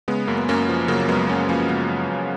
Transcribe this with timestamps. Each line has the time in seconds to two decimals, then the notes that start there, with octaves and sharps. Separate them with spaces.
0.08 C#3 G#3 B3
0.27 F#2 A#3
0.38 B3
0.48 F#2 A#3 C#4
0.69 F3
0.88 C#3 F#3 A#3
1.00 A#3
1.09 F#2 G#3 B3
1.29 F#2 A#3 C#4
1.49 F3 A#3 C#4
1.69 C#3 G#3 B3
1.89 F#2
2.09 F#2